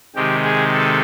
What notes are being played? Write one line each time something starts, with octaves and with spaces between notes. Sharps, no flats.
C3 D#3 G#3 G4
G#4
A4